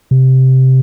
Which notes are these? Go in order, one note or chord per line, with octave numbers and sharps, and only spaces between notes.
C3